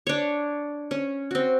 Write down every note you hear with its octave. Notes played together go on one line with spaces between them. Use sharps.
D4 C#5
C#4
C4 F#4